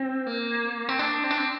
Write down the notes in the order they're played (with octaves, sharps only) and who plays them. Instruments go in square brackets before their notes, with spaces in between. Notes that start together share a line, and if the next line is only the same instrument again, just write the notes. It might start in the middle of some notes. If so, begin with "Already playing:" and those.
Already playing: [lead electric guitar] C4
A#3
C4
D4
C4
D4
C4